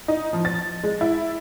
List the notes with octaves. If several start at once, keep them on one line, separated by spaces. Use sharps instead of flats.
D#4
F3
A6
G#3
E4